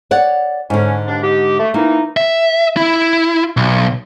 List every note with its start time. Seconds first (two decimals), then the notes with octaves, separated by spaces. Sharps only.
0.11 C#5 D5 F#5
0.70 G#2 D3 C#4
1.08 D#2 D4
1.23 D#4 G4
1.59 A3
1.74 E3 A#3 D#4
2.17 E5
2.77 E4
3.57 B1